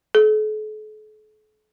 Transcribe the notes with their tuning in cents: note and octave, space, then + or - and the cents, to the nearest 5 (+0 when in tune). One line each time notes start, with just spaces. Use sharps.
A4 -45